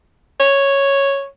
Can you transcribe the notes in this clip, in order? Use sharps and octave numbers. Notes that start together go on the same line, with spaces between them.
C#5